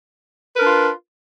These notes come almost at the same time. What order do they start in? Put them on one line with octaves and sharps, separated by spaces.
B4 A#4 D4 F4